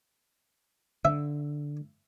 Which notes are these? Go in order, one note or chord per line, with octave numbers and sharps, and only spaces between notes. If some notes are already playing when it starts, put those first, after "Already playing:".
D3 E5